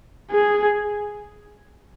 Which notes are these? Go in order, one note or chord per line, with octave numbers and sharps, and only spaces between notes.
G#4